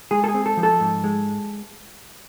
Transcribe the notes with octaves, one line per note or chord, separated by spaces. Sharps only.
G#3 G#4
A4
G#4
C4
A4
F3
A4
G#2
G#3